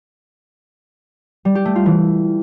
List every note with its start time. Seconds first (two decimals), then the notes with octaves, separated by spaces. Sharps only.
1.45 G3
1.55 G4
1.65 A3
1.76 F4
1.86 E3